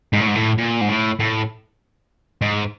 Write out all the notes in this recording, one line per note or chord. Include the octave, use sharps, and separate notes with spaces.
G#2
A2
G#2
A2
A#2
G#2
A2
A2
G#2